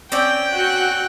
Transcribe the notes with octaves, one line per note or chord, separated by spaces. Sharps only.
C4 C#4 D5 G5
F#4 F#6